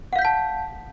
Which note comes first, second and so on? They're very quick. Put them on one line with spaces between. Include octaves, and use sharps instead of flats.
F#5 F5 G6 B6 A5